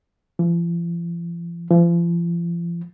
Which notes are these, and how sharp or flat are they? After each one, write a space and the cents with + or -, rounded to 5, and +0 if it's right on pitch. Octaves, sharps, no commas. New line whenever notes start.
F3 -45
F3 -40